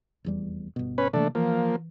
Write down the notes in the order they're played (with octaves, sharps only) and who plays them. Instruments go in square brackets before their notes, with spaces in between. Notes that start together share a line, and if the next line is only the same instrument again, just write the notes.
[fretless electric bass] F1 E2 G3
G1 B2
[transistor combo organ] C#4 B4
[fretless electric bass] C3 E3 A#3 [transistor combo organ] A3 D4
[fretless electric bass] E3 [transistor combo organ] F3 A#3